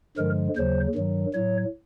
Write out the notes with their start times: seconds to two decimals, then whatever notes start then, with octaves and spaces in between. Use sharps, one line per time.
0.17 G2 D3 F3 G#3 A#4
0.56 D#2 C#3 F#3 C5
0.95 G2 D#3 F#3
1.33 A2 F#3 C#5